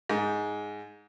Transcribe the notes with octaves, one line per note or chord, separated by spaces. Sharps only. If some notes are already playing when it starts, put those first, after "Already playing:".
G#2